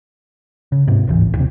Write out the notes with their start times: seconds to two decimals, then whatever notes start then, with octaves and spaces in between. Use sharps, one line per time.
0.72 C#3
0.87 G#2 C3
1.07 G1 D2 E3
1.20 A1
1.35 D#2 C3